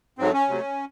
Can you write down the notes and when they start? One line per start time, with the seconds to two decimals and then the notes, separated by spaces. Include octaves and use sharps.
0.19 G#2 F#3 A3 C4
0.33 C#4
0.48 C3 F#3 A3